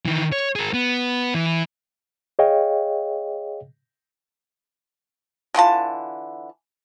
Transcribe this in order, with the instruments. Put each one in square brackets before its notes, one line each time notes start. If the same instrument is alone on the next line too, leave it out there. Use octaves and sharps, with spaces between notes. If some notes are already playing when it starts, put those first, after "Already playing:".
[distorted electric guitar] D#3 E3
C#5
G#4 A#4
B3
E3
[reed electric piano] G#4 C#5 D#5 F5 G5
[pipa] D3 E3 F4 A5